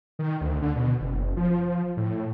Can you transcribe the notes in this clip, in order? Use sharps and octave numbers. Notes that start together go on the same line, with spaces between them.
D#3
D2
D3
B2
F#1
F3
A2